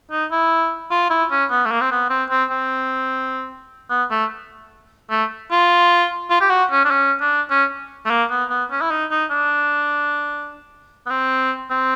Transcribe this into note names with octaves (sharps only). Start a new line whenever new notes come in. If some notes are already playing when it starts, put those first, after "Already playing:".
D#4
E4
F4
E4
C#4
B3
A3
A#3
C4
B3
C4
C4
C4
B3
A3
A3
F4
F4
G4
F#4
C#4
D4
C#4
D4
C#4
A3
A#3
B3
B3
C#4
E4
D#4
D#4
D4
B3
C4
C4